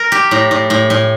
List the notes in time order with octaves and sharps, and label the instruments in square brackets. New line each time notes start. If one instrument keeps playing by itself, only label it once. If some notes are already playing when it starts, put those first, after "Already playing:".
Already playing: [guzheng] A#4
G4
A2
A2
A2
A2